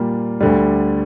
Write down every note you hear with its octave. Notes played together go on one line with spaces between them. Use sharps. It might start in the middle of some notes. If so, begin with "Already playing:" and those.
Already playing: A#2 G3 A#3 F4
D2 D3 G3